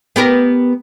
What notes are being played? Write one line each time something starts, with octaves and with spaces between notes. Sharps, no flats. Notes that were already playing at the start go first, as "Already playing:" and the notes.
B3 G4 A#4